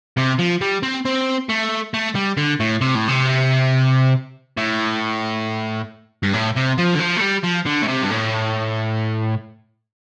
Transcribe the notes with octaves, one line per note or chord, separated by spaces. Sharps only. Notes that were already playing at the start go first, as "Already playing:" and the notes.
C3
F3
G3
C4
C4
A3
A3
G3
D3
A2
C3
A2
C3
A2
G2
A2
C3
F3
D3
F3
A3
G3
F3
D3
A2
C3
G2
A2